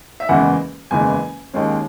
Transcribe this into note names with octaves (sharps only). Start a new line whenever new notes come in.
E5
F#1 E2 C#3 E3 G#3 F#5
F#1 E2 C#3 E3 G#3 G#5
D#2 D#3 G#3 C#4